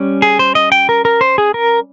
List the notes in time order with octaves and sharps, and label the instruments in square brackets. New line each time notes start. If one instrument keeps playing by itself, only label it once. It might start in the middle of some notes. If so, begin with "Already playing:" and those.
Already playing: [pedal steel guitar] G3 C#4
G#4
C5
D#5
G5
A#4
A#4
C5
G#4
A#4